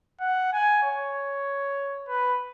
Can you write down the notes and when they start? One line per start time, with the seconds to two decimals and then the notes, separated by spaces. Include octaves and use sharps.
0.21 F#5
0.53 G#5
0.83 C#5
2.08 B4